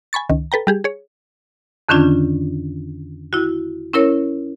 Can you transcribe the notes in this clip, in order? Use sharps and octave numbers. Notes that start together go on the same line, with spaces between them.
G#5 B5 C#6 A6
C#2 D#3
A4 B4 G5 A#5
G3 G4 G#4
G#4 C#5
F2 D3 D#3 C#4 D4 F4
E4 F#4
C#4 E4 A#4 C#5